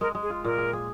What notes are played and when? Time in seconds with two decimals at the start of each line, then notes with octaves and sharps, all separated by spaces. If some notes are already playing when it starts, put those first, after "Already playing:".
0.01 G#3 A#4
0.15 G#3
0.22 G#4
0.30 F4
0.45 A#2 A#4
0.58 G#4
0.73 G#4